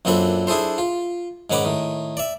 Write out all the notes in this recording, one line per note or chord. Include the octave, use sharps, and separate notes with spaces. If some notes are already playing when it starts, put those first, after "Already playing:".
F#2 A#2 C4 D4 A4 B5
D4 E4 G#4 A4 C5
F4
G#2 D#3 C#4 F#5 B5 D6
A2 D#3
D5 E5